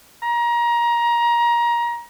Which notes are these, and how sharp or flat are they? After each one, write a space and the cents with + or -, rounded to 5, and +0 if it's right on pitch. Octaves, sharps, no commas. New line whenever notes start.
A#5 +25